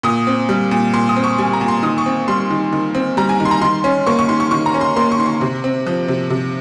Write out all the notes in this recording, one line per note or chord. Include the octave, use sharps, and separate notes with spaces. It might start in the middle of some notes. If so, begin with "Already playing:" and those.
A#2 D#6
C4
G3
A#2
A#2 C6
D#6
C4
C#6
G3 G#5
A#5
A#2
C6
D#3 D#6
C#6
C4
G3 C6
D#3
D#3
C4
G3 A#5
G#5
D#3
C6
A#5
D#3 C6
C#4
A#3 C#6
C#6
D#3 C6
C#6
D#3 C#6
A#5
C#4
C6
A#3 C6
C#6
D#3 C6
C#6
C3
C4
F3
C3
C3